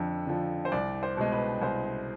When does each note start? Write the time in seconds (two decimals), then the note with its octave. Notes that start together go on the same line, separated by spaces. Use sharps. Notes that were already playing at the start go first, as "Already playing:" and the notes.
Already playing: F2 D3
0.27 D3 F3
0.65 C5
0.72 C2 D5
1.03 C5
1.17 B2 G#3
1.32 B4
1.62 C2 C5